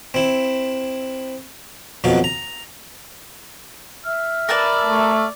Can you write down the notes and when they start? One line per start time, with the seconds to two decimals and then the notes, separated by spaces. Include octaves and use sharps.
0.14 C4 E4
2.04 F2 B2 F#3 F5
2.24 A#5
4.05 E5 E6 F6
4.49 A#4 B4 D5 A5
4.84 A3